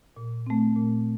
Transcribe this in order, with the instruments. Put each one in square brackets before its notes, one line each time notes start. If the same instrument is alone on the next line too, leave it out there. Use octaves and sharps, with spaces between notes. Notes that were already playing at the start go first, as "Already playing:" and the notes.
[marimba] A#2
A3 C4
A#2